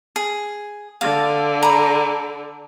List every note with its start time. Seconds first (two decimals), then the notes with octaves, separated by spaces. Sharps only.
0.16 G#4
1.01 D3 F5
1.63 A#5 B5